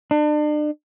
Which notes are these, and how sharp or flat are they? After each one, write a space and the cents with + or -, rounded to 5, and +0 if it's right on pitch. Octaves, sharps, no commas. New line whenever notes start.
D4 +40